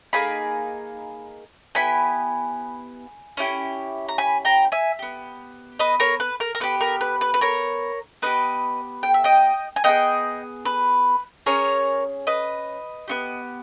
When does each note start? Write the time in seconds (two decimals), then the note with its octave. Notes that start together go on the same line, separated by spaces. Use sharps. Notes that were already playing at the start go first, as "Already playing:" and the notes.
0.13 A#3 D#4 G#4 G#5 B5
1.75 B3 E4 G4 G#5 B5
3.37 C#4 E4 G4
4.09 A#5
4.18 G#5 B5
4.45 G5 A#5
4.72 E5 G#5
4.99 B3 G4
5.79 B4 D#5
6.00 A#4 C#5
6.20 B4
6.40 A#4
6.55 A#4
6.60 B3 G4 B4
6.81 A#4
7.01 B4
7.21 B4
7.34 B4
7.41 A#4 C#5
8.22 B3 D#4 G4 B4 D#5
9.03 G5
9.14 E5
9.24 D#5 G5
9.76 G#5
9.84 B3 E4 D#5 G5
9.88 G#4
10.65 B4
11.46 C#4 G#4 A#4 C#5
12.27 B4 D#5
13.08 B3 D#4 G4